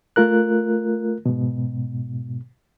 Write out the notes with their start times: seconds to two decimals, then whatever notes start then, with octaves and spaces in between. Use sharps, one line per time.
0.16 A3 F4 A#4 F#6
1.26 G#2 B2